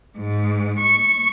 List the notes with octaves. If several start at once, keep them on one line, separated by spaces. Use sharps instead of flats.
G#2
C#6